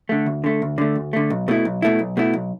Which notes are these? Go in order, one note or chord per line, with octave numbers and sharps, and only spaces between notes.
D3 A3
D2
D3 A3
D2
D3 A3
D2
D3 A3
B1
B2 A3 E4
B1
B2 A3 E4
B1
B2 A3 E4
B1